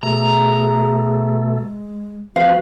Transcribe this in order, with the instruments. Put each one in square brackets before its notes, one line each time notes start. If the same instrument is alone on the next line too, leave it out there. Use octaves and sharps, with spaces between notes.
[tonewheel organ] B2 A3 [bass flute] G#4 [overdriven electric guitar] A#5
[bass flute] G#3
[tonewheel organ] F3 C4 B4 [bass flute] F#4 [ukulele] F5